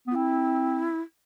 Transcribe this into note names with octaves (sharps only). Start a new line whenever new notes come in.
B3
F4
C4 E4